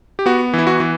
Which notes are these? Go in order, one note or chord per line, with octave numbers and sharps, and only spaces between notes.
G4
B3 F#4
E3 E4
F#4
E3